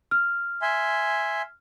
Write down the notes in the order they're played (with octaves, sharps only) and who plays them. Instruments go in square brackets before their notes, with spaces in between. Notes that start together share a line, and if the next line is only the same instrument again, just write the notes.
[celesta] F6
[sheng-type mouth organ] E5 G#5 C6